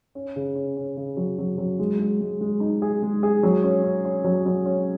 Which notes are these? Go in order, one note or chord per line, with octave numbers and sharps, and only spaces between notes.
C#4
C#3
C#4
C#4
C#3
F#3
F#3
F#3
G#3
G#3
G#3
G#3
D#4
G#4
G#3
G#4
F#3
C#4
C#4
C#4
F#3
F#3
C#4